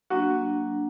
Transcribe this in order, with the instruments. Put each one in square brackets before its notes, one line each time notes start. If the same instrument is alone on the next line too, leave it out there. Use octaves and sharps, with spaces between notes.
[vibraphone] F#3 A#3 D4 [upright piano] F#4